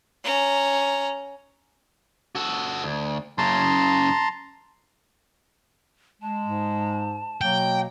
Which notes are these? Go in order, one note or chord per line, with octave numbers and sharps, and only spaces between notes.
C#4 A#5
F#4 A4
D2
F#2 C#3 A5 A#5 C6
G#3 A5
G#2
B2 F#3 A#3 G5